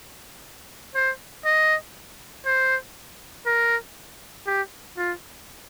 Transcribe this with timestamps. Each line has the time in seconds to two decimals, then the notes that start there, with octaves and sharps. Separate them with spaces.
0.95 C5
1.45 D#5
2.46 C5
3.46 A#4
4.47 G4
4.97 F4